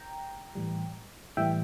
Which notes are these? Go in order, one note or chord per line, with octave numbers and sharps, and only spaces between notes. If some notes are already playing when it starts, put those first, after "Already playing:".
Already playing: G5 A#5
A2 E3 G3
A2 E3 G3 E5 G5